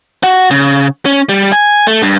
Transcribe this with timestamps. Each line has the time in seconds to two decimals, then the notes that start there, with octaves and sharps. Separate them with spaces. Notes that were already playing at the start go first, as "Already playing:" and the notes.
0.23 F#4
0.51 C#3
1.05 C#4
1.29 G3
1.52 G#5
1.87 A3
2.02 G2